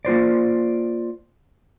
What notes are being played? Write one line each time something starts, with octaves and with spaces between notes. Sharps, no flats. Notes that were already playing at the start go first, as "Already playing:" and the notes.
A#3 F4 C5 D5